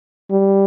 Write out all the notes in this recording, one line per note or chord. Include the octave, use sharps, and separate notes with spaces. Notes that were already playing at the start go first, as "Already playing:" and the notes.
G3